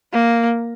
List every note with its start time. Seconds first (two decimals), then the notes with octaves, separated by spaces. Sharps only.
0.14 A#3